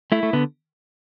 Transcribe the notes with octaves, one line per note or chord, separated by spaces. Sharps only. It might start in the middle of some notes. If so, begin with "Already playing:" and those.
A3 E4
A3
D3 B3